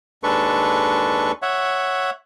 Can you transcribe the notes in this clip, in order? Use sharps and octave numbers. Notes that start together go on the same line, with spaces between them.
D#2 G#3 D4 A4 B4 C#6
C#5 E5 F#5